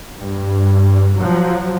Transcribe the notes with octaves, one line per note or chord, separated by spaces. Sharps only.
G2
F3 F#3